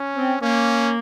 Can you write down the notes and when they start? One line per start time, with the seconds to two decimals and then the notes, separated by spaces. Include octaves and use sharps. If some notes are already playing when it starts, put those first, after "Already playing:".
Already playing: C#4
0.16 C4
0.41 A#3 C#4